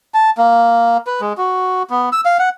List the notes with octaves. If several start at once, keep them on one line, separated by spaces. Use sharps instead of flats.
A5
A#3
B4
G#3
F#4
B3
E6
F5
F#5